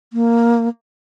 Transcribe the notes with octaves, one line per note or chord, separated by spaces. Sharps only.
A#3